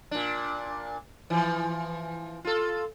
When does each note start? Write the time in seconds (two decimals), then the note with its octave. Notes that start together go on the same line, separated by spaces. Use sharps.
0.11 A#2 D4
1.30 E3 F3
2.45 F4 A4